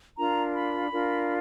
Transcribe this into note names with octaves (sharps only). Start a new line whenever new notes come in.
D4 F4 A#4 A#5
B5
D4 F4 A#4